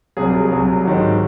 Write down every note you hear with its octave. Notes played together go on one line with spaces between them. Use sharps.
C2 C3 F#3 G#4
G#4
C2 C3 F#3
G#2 D#3 F#3